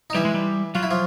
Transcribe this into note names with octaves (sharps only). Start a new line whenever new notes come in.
D#4
E3 G3 E4
G#3
G3
F#3 F4
E4
F3 F4